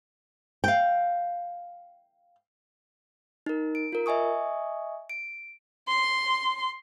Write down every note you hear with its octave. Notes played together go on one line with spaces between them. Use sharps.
F5 G5
D#4 A#4
D7
F4 A#4
D#5 E5 G#5 C#6 D#6
D7
C6